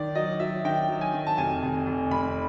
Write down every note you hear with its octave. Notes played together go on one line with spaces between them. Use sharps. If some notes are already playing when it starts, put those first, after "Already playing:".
Already playing: D#3 D5
F#3 D#5
F#3 E5
D#3 G5
F#3
G#5
D#3
A5
F1 G#5
F1
F1
F1 B5